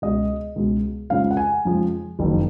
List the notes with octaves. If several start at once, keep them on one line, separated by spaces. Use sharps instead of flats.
C#2 B2 G#3 D#5
C#2 B2 G#3
F2 C#3 F3 G#3 F5
F#5
G#5
F2 C#3 F3 G#3
F#1 F2 D#3 F#3